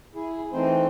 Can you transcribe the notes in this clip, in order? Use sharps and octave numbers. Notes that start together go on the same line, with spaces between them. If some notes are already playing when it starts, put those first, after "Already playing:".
E4 G#4
E3 A3 C4 D#4 C5